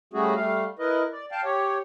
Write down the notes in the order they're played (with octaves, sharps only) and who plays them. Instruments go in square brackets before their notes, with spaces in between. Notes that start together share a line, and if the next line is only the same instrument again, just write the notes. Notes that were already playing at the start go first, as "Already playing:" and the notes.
[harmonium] G3 A3 C#4 F#4 G#4
G3 A3 F5
E4 A#4 B4 D#5
D5
F5 G5 A5
G4 C#5